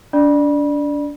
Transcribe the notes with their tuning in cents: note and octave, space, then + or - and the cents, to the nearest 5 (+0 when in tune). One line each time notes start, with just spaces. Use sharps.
D4 -30 D5 +20 B5 -30